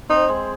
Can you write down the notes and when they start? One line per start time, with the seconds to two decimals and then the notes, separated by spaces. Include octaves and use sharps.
0.09 C4 D#4
0.29 G#3